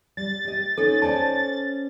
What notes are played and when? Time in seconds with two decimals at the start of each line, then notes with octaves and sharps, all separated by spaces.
0.17 G3 A6
0.45 G4 D#5
0.78 C#4 D#4 A4
1.02 C#4 C5 D5 A5